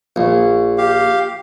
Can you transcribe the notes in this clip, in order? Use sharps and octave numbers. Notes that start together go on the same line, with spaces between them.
A#1
G4 F5